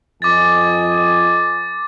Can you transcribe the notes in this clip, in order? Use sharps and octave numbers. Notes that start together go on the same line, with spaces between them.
F2 D#5 G#5 D6 A6